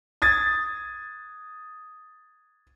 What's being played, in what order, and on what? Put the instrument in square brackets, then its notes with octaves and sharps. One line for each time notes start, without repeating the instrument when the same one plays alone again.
[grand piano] D#6 G#6 A6